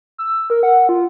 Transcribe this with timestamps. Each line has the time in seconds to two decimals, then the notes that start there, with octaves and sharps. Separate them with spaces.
0.18 E6
0.50 A#4
0.63 F#5
0.89 F4